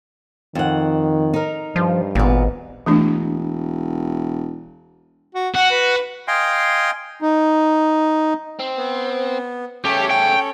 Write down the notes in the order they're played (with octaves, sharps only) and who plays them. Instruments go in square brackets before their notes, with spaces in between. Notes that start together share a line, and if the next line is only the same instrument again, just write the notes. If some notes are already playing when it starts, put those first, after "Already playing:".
[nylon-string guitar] F2 F#5 [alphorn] D#3
[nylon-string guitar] D#4 A#4
[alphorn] G2 [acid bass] F3
[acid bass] G#1 [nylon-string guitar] A#2 B3
[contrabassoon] E1 [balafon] E3 A3 D4
[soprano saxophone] F#4
[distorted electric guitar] F#4 [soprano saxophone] F#5
[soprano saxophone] B4
[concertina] D#5 F5 G5 G#5 C6
[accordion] D#4
[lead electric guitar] C4
[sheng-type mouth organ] B3
[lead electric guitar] C#3 A3 [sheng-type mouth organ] C#4 A4 C#5 [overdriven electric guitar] G4
[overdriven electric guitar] G5